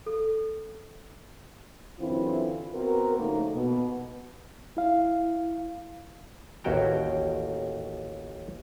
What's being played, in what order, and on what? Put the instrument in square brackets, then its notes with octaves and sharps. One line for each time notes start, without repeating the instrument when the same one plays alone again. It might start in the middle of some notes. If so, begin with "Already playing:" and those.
[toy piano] A4
[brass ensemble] F#2 D3 E3 C4 E4 F4
B3 C4 F#4 A#4
C#3 F3 A3 A#3 D#4
B2
[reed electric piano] E4 F5
[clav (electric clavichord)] A1 D#2 C#4 F#4 G5 A#5